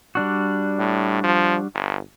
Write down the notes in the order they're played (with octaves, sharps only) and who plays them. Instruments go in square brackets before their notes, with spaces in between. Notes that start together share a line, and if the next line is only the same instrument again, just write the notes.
[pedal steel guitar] G3 D4 F#4
[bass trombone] A2
F3
G1